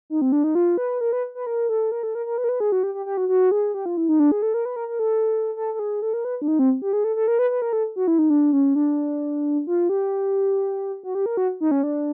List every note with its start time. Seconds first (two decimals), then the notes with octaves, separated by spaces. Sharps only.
0.10 D#4
0.22 C4
0.32 D4
0.44 D#4
0.55 F4
0.78 B4
1.01 A#4
1.13 B4
1.35 B4
1.47 A#4
1.69 A4
1.92 A#4
2.03 A4
2.15 A#4
2.26 A#4
2.38 B4
2.44 A#4
2.49 B4
2.60 G#4
2.72 F#4
2.83 G4
2.95 G4
3.06 G4
3.17 F#4
3.29 F#4
3.51 G#4
3.74 G4
3.86 F4
3.97 E4
4.09 D#4
4.20 D4
4.32 G#4
4.42 A4
4.54 A#4
4.65 B4
4.76 A#4
4.88 A#4
4.99 A4
5.56 A4
5.74 A4
5.79 G#4
6.02 A4
6.13 A#4
6.25 B4
6.42 D4
6.48 D#4
6.59 C4
6.82 G4
6.93 G#4
7.04 A4
7.16 A4
7.28 A#4
7.39 B4
7.50 B4
7.62 A#4
7.73 A4
7.96 F#4
8.08 E4
8.19 D#4
8.30 D4
8.53 C#4
8.75 D4
9.67 F4
9.89 G4
11.03 F#4
11.15 G4
11.26 A#4
11.37 F#4
11.61 D#4
11.71 C#4
11.83 D4